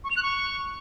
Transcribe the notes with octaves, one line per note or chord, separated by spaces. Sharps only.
C#6
F7
F#6
C#6